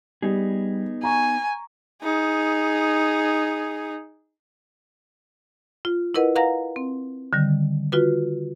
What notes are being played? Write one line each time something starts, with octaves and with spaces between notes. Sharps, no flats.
G3 B3 D#4 G#4
G#5 A#5 C#6
D#4 G#4
F4
E4 A#4 B4 D#5 F#5
B4 F5 F#5 A#5 A#6
C4
D3 D#3 G3
F4 F#4 B4